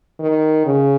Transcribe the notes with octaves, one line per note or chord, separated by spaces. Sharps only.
D#3
C#3